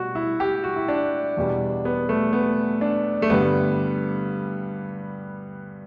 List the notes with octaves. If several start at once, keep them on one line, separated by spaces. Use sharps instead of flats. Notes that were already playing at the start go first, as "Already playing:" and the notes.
Already playing: B2 G3 F#4
E4
G4
F#4
E4
D4
E2 B2 G3
B3
A3
B3
D4
A3
G2 D3 G3 B3